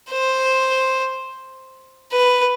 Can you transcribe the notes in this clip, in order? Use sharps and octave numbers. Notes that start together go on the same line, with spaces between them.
C5
B4